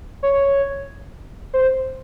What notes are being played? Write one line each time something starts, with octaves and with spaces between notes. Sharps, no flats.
C#5
C5